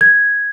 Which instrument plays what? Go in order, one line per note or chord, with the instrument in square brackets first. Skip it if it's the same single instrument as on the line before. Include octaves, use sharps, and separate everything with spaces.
[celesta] G#6